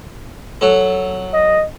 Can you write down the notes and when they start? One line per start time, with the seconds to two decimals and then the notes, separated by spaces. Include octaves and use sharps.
0.61 F#3 A4
1.33 D#5